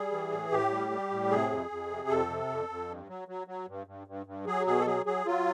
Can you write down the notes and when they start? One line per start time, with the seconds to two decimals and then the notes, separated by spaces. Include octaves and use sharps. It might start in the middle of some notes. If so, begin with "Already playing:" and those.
Already playing: G3 G#4
0.12 E3
0.31 A2
0.51 A2 G4
0.71 G3
0.90 G3
1.11 A2
1.30 C3 G#4
1.50 F2
1.70 F2
1.90 C3
2.09 F2 A4
2.29 C3
2.49 F2
2.69 F2
2.89 G2
3.08 F#3
3.28 F#3
3.47 F#3
3.68 G2
3.87 G2
4.07 G2
4.26 G2
4.46 F#3 G#4
4.67 B2 G#4
4.80 A4
4.86 F#3 G#4
5.06 F#3 G#4
5.26 F#3 F4